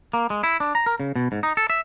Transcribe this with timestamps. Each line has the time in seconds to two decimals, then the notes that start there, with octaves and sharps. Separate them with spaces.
0.13 A#3
0.30 G#3
0.44 E4
0.60 D4
0.75 A#5
0.86 A#4
1.00 C#3
1.16 B2
1.32 G#2
1.43 D#4
1.57 A4
1.70 E5